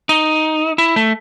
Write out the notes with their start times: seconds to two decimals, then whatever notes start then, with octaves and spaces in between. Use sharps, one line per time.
0.09 D#4
0.78 E4
0.96 A3